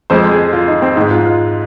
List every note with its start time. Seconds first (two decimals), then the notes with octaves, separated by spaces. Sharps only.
0.10 F2 F3 G#3 C5
0.31 G#4
0.53 F4
0.68 D#4
0.82 C4
0.96 G#2 G#3 D#4
1.11 F4
1.25 F4